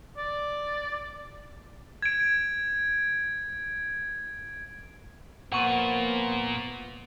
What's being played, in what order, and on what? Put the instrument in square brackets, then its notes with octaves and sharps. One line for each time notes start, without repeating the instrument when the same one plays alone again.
[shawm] D5
[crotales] G#6 D7
[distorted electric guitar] A#2 [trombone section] F3 A#3 B3 [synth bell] F#5 C#6